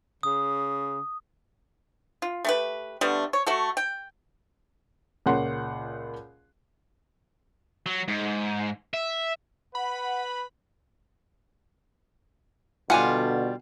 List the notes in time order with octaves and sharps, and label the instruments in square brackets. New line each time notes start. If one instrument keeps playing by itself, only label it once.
[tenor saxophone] C#3 [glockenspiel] D#6
[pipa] F4
A3 G4 B4
D3 G3 A3 B3
C#5
A3 F#4 A4
G5
[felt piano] C#2 A#2 C#5 F#5 C6
[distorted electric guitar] F#3
G#2
E5
[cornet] B4 [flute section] F#5 [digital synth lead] B5
[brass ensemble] B2 D3 [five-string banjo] G3 F4 [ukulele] F#5 G#5